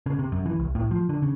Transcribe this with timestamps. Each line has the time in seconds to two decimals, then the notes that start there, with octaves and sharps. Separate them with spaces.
0.06 C#3
0.19 C3
0.32 F#2
0.46 E3
0.59 C2
0.75 A2
0.91 F3
1.09 D3
1.22 C#3